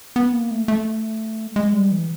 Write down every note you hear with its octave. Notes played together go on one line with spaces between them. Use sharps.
B3
A#3
A3
A3
G#3
G3
E3